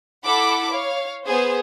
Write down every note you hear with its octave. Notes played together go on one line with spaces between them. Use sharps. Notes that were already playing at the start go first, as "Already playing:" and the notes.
E4 A4 F#5 B5 D6
C#5 F5
B3 G#4 C5